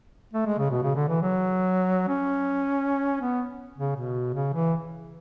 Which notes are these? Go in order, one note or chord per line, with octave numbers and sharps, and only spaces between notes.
A3
G#3
C#3
B2
C#3
D3
E3
F#3
C#4
B3
C#3
B2
C#3
E3